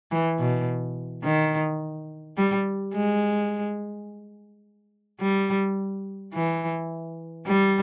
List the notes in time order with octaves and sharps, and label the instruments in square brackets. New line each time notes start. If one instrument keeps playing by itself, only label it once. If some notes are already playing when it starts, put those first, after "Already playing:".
[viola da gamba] E3
B2
D#3
G3
G#3
G3
E3
G3